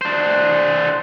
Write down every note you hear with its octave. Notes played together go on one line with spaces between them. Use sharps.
D4 C5